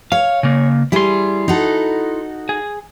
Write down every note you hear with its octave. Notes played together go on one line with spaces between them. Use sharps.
C#5 F5
C#3 A#3
G3 E4 G#4 C6
D#4 F#4 A4
G#4